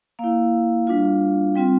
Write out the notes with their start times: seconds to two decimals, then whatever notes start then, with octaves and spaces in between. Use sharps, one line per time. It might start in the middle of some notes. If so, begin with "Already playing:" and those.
0.19 A#3 E4 F5
0.87 G3 D4 F4
1.55 G3 C4 F4 G5